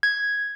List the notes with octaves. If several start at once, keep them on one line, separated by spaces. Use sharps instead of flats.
G#6